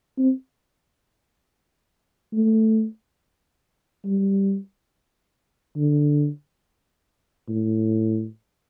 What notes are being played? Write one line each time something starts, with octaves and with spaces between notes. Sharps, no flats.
C4
A3
G3
D3
A2